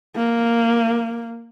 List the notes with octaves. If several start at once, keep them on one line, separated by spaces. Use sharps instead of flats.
A#3